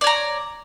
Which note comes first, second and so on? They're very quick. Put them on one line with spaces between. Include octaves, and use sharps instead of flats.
D5 C#5 A#5